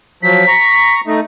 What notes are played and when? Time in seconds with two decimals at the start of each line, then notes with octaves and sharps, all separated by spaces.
0.23 F3 F#3 B6
0.48 A#5 C#6
1.07 A3 D#4